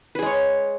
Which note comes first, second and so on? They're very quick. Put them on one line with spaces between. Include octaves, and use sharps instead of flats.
B4 G#4 G#3 C#5